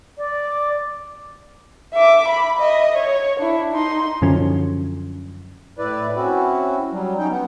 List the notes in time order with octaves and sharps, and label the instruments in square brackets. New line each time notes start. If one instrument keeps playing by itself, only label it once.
[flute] D5
[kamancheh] E5 D6
B5
D#5 E5
C#5
D4 E4
D#4 C6
[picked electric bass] F#2 D3 F3 C#4
[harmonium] A2 E4 B4 D5
C4 C#4 E4 F#4
F#3 G3
F#3 C#4 D#4 G5
B3